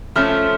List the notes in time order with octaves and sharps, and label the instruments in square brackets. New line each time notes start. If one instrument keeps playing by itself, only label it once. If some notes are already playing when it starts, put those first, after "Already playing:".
[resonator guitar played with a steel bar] F3 A3 C#4 [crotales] F6